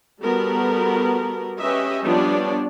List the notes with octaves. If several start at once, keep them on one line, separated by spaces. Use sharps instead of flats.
G3 B3 F#4 A4 A#4
C#4 G4 B4 D#5 E5
F3 G3 B3 D4 C#5 D5